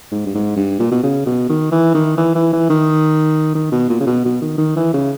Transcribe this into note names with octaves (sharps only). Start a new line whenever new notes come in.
G#2
G2
G#2
G2
A#2
B2
C#3
B2
D#3
E3
D#3
E3
E3
E3
D#3
D#3
B2
A#2
C#3
B2
B2
D#3
D#3
E3
C#3